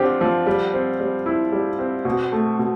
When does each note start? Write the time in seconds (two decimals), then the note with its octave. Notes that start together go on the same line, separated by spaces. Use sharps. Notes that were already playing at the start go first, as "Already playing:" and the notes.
Already playing: D3 F3 C4 G4
0.21 F3
0.47 G3
0.73 C4
1.00 G3
1.26 E4
1.52 G3
1.79 C4
2.05 B2
2.32 A3
2.59 B2